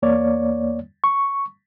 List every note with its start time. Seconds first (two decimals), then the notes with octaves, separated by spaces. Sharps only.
0.02 E2 A#3 C#5 D5
1.04 C#6